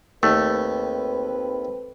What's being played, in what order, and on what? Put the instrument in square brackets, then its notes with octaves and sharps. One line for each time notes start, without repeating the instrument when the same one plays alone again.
[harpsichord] D#2 [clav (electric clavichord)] A3 [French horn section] C4 A4 B4